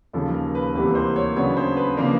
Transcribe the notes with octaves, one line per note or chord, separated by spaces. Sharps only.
D#2 C#3 F3 A4
A#4
B4
D2 C3 E3 G3 A#3 B4
C5
C#5
C#3 F#3 B3 D4 C#5
C5
B4
C#3 F3 A#3 D4 A#4